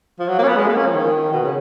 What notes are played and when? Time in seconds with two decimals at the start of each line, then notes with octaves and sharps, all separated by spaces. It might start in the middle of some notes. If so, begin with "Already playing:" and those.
0.20 F3
0.29 F#3
0.38 A#3
0.43 C#4
0.48 B3
0.57 G#3
0.67 A#3
0.76 C#4
0.86 F3
0.95 D#3
1.33 B2
1.44 C#3